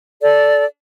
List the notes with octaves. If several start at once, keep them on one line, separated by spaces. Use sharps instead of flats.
A4 D5